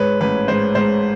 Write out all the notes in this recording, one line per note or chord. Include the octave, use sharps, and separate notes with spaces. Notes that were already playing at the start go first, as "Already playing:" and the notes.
Already playing: G#2 B4 C#5
A1 B4
G#2 C5
G#2 C5